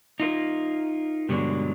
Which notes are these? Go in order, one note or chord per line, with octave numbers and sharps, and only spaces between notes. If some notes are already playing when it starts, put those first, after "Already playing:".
D#4 F4 A#4
G2 B2 D3 F#3 G#3 D4